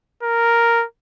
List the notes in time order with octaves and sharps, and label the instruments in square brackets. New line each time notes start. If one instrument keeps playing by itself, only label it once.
[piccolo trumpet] A#4